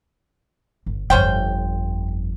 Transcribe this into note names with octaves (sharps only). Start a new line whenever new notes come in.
G1
G1 F2 C#4 C5 G5